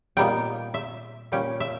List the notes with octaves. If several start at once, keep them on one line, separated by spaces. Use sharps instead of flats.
A#2 G3 B3 D#4 G5
E5
A#2 G3 C#4 G5
E5